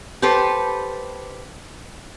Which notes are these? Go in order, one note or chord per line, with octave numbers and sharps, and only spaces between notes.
G4 A4 B4 C5